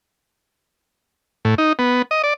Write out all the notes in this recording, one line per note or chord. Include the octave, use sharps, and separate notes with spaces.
A2
D#4
B3
D#5
D5